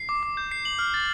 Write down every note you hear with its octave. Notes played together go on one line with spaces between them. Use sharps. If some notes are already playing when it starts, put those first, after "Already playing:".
Already playing: C7
D6
D6
G6
C7
F#7
F6
A6